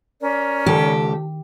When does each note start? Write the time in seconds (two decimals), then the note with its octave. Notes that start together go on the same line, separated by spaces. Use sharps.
0.20 C#4 A#4 D5
0.66 C#2 D#3 G4 A4